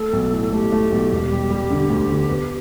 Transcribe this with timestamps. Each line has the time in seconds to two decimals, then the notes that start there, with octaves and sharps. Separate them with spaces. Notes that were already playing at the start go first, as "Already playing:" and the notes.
Already playing: A3 A4
0.13 B1
0.32 A2
0.52 A3 G4
0.72 A3
0.92 B1
1.12 E1
1.31 G3
1.51 G3
1.70 D3
1.90 D2
2.10 D3
2.29 B3